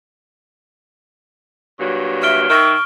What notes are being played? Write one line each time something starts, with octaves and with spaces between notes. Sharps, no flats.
G2 A#2 F#3
E5 F6 D7 G7
D#3 E5 C#6 F6